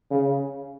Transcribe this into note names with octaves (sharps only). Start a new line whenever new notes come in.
C#3